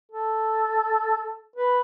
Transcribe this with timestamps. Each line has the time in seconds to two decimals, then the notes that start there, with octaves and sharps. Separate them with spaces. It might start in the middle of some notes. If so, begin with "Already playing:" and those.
0.12 A4
1.56 B4